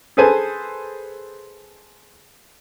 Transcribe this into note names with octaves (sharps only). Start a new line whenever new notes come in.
G#4 A4 B4 C5 G#5 A5